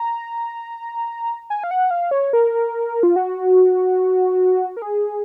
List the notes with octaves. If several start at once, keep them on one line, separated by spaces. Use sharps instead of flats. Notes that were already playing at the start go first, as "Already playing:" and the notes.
Already playing: A#5
G#5
F5
F#5
F5
C#5
A#4
F4
F#4
A#4
G#4